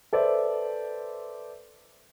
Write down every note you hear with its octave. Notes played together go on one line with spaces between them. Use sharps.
A4 B4 C5 D5 E5